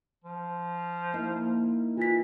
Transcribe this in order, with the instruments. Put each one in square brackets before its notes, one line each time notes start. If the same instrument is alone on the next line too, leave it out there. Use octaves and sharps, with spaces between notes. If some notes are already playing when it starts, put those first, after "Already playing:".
[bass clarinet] F3
[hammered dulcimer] A#3 D#4 E4
[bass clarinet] E3 [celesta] F4 B6